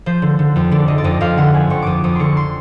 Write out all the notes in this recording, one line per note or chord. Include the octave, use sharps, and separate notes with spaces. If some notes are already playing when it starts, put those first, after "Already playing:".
F3 C5
D3
D3
F2
D3 D5
D3 D#5
D5
F2 D#5
F2 F5
D3 F#5
F3 G#5
F2 C#6
F2 D6 D#6
F2 D#6
D3 C6 C#6
C6